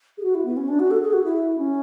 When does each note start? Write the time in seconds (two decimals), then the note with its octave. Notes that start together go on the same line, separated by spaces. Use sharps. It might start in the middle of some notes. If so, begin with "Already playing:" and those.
0.18 G#4
0.23 F#4
0.35 E4
0.45 B3
0.57 C#4
0.68 D4
0.79 F#4
0.91 A4
1.01 G#4
1.13 F#4
1.24 E4
1.58 C#4